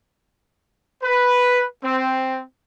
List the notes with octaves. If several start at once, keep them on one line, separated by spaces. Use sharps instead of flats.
B4
C4